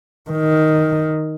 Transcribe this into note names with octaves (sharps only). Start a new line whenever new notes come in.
D#3